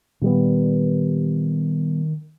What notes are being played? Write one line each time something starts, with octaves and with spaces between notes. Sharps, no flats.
A#2 D#3 G3 B3